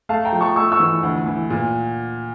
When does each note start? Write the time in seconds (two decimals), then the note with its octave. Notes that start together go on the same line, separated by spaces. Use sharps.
0.09 A3 F5 A5
0.25 G5 A#5
0.32 F3
0.40 A5 C#6
0.56 A3 C#6 E6
0.72 C#6 E6
0.80 E3
1.03 D2
1.26 E3
1.50 A#2